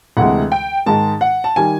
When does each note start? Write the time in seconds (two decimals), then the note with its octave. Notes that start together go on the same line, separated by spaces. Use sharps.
0.17 D2 C3 E3 G#3 F#5
0.52 G5
0.86 G#2 D#3 G#3 A5
1.21 F#5
1.44 A5
1.56 D#3 G3 G#5